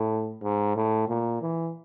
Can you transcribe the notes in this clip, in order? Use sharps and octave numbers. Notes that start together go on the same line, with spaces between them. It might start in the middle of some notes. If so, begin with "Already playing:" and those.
Already playing: A2
G#2
A2
A#2
E3